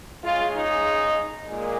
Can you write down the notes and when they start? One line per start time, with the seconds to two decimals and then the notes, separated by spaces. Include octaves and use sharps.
0.24 C#3 G#3 F4
0.55 D#4
1.46 A#2 G#3